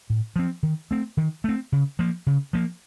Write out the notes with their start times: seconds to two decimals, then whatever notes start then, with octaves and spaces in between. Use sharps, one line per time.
0.10 A2
0.36 F3 C4
0.63 D#3
0.91 A3 C4
1.17 D#3
1.44 A3 C4
1.72 C#3
1.99 F3 A#3
2.27 C#3
2.53 F3 A#3